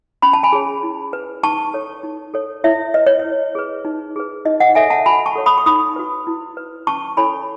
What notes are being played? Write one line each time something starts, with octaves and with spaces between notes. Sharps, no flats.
C#4 B5
A5
G#5 B5
G#4 C#5
E4
B4
D#4 A5 C#6
A4 C#5
D#4
A4 C#5
E4 C#5 E5
B4 D#5
C#5
E4 D#5
G#4 B4
D#4
G#4 B4
D#4 D#5
D#5 F#5
A4 C#5 E5 G#5
F#5 A5
F#4 G#5 B5
A5 C#6
A4 C#5
B5 D#6
C#6
D#4 B5 D#6
F#4 B4
E4
B4
C#4 A5 C#6
E4 A4 C#5 G#5 B5